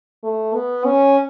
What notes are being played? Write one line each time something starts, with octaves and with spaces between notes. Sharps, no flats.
A3
B3
C#4